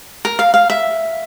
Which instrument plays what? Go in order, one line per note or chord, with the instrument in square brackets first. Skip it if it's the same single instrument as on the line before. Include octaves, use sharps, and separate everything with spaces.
[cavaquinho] A#4
F5
F5
E5